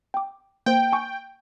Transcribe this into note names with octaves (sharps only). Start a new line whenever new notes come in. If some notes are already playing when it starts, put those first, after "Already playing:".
G5 D6
A#3 C5 G5
G#5 C#6